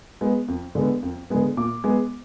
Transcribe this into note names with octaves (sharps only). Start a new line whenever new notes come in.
G#3 B3
F2
D3 G#3 B3
F2
D3 G#3 B3
A#2 D6
G#3 B3